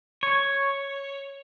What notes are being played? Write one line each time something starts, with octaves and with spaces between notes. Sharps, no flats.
C#5